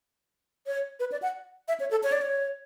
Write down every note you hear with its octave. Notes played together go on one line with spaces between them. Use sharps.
C#5
B4
D5
F#5
E5
C#5
A4
C#5
D5
C#5